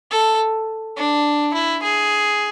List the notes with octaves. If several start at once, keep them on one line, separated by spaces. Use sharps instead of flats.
A4
D4
E4
G#4